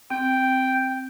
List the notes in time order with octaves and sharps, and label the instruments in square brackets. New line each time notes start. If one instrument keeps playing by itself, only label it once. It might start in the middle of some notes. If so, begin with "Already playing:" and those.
[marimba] C4 [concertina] G5